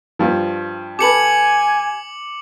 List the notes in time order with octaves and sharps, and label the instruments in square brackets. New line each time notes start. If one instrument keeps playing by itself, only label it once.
[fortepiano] G2 F3
[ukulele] G4 A4 B4 [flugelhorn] G#5 [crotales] D6 C#7 F#7